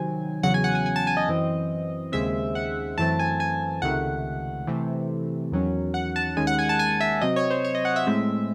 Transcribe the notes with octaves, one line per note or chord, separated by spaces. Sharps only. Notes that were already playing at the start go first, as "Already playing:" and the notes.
Already playing: C3 D#3 F#3 C4 G#5
E2 C#3 F#3 F#5
G#5
F#5
G#5
G#5
A5
G#5
D#5
F#2 E3 C4
D#2 C#3 G#3 C4 E5
F#5
F#2 E3 A3 C4 A5
G#5
G#5
C#2 C3 D#3 A3 F#5
C3 E3 A3 C4
E2 D#3 F#3 C#4
F#5
A5
D#2 D#3 G#3 C#4 G#5
F#5
G#5
A5
G#5
E5
C3 F#3 C4 D#5
C#5
C5
C#5
D#5
F#5
E5
A2 G#3 C4